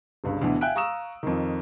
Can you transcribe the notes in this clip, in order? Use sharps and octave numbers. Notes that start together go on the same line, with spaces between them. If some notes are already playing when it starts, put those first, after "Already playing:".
G1 C#2 G2
D2 B2 D3 E3
E5 F5 G5 G#5 F#6 D7
F5 A#5 C#6 D#6 E6 E7
F2 D#3